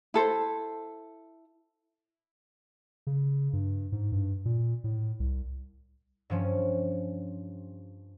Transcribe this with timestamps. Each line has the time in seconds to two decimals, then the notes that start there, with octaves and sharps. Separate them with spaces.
0.14 E4 A4 C5
3.07 C#3
3.53 G2
3.92 G#2
4.12 G2
4.45 A#2
4.84 A2
5.20 C2
6.30 G2 F3 C#4